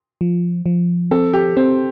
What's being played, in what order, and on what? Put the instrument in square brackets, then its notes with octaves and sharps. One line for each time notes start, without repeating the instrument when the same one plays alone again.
[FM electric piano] F3
F3
[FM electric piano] C4 [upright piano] A4
[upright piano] G4
[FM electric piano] C4 [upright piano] C5